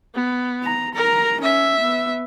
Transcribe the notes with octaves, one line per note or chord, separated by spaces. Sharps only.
B3
A#5
A#4 A#5
C#4 E5
B3